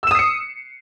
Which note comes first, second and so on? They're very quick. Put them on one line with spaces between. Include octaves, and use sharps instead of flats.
E6 E7 D#6 C7 C#7